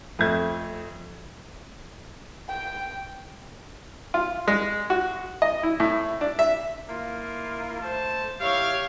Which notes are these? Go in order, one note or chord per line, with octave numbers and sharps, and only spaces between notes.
F2 A3 G#6
G5
F4
G#3
F#4
D#5
E4
A2
D4
E5
A#3 E4 F4
A3 C5 A5
E4 G4 C#5 F5